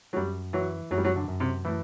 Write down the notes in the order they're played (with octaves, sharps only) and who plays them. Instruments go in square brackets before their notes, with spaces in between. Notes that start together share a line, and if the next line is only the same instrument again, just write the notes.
[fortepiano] F#3
[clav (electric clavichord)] F#2 [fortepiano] G3
[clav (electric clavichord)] E3 [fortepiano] F#3
[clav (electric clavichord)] F#2 [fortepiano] F#3
[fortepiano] G3
F#3
D3
[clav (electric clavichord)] F#2
[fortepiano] C3
[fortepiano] A2 [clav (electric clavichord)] E3